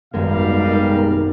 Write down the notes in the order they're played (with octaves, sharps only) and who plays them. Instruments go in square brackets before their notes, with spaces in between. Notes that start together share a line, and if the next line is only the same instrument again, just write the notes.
[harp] G#1 F#2 [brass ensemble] B2 G3 F5 [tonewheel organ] G#3 B3 A#4
[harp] D#4